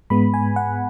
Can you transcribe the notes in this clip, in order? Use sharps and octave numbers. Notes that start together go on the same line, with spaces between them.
G#2 G#3 B3 B5
G#5
F#5